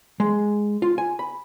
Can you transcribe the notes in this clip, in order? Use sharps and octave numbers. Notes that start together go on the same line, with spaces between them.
G#3
F4
G#5
B5